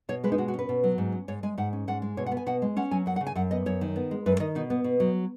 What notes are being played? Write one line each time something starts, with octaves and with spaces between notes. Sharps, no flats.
B2 C#5
G#3 B4
D#4
B2 F#4
F#4
C#4 B4
B2
F#3
G#2
C#4
G#2 C#5
G#3 G#5
G#2 F#5
C#4
G#2 F#5
G#3
B2 C#5
F#5
B3
G#5
B2 F#5
G#3
C#4 F#5
F#3 G#5
F#2 F#5
F#5
C#3
G#5
F#2 F#5
B3 D#5
F#2 C#5
D#3
B3
G#3
F#2 B4
D#3 D#5
B2 D#4
B3
B2
F#3